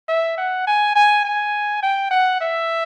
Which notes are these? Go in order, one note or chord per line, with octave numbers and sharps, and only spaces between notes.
E5
F#5
G#5
G#5
G#5
G5
F#5
E5